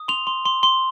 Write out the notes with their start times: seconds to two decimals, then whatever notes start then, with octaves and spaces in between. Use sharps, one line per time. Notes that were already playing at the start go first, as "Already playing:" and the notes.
Already playing: D#6
0.08 C6 F7
0.27 C6
0.45 C6
0.63 C6